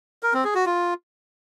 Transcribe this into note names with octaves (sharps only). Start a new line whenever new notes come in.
A#4
C4
G#4
F#4
F4